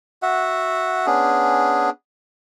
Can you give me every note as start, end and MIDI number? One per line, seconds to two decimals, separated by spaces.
0.22 1.06 66
0.22 1.06 76
0.22 1.06 78
1.06 1.90 59
1.06 1.90 61
1.06 1.90 62
1.06 1.90 68